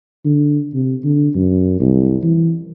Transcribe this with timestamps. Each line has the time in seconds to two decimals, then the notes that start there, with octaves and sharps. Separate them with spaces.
0.25 D3
0.74 C3
1.05 D3
1.35 F#2
1.80 C2
2.23 E3